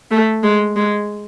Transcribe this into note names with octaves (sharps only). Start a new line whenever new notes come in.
A3
G#3
G#3